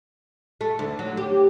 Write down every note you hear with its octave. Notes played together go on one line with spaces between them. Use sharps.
A3
D2
F#3
G4